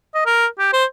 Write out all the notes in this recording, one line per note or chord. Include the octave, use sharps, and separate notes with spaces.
D#5
A#4
G4
C5